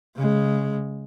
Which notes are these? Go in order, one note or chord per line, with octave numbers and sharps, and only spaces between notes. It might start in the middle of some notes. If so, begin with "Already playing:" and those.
C#3 G#3